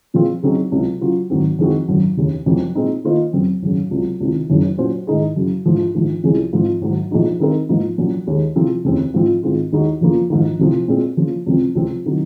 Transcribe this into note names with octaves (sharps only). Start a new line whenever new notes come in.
A#2 F3 G#3 C4 F4
C#3 F#3 C4 D#4 G#4
C#2 C3 F#3
C#3 F#3 C#4 F4
G#1 G#2 D#3 F#3 C4
F2 D#3 G#3 C4 F#4
G#1 F#2 C#3 F#3
F1 D#2 C#3
F1 F2 C#3 F#3
A#2 G#3 C4 D#4
D#3 A#3 F4 C5 D#5
F#2 C#3 F#3 C4
G#1 F#2 C#3
C#2 C3 F#3
C#2 C3 D#3
F#1 F#2 D#3 G#3 C#4
A#2 F#3 C#4 F#4 C5
G#2 D#3 G#3 D#4 G#4
F#2 C#3 F#3
A#1 G#2 F3
A#1 G#2 D#3
C2 C3 F3 G#3 C#4
G#2 F3 C4 F4
G#1 G#2 F#3
A#1 A#2 G#3 D#4 F#4
D#3 G#3 C4 D#4 A#4
G#2 F3 A#3 D#4
A#1 A#2 F#3 C#4
D#2 D#3 G#3
C3 F3 G#3 C4
F1 D#2 C#3 G#3 C4
G#2 F3 C4 F4
G#2 D#3 G#3 C4 F4
D#2 D#3 G#3 D#4 F#4
F2 C#3 F3 A#3 F4
A#1 G#2 D#3
F1 F2 C3 F3
A#2 G#3 C4
C#3 F3 A#3
C#2 C3 F3 C4
C#2 C3 F3 C4
C3 D#3 F#3